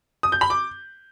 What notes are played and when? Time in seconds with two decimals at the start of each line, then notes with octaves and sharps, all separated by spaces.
0.23 D#6
0.32 G6
0.41 B5
0.50 D6